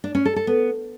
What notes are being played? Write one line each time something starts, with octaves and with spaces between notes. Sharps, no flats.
D4
C#4
A4
A4
B3